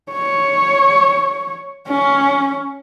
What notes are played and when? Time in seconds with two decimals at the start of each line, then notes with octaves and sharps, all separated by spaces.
0.12 C#5
1.88 C#4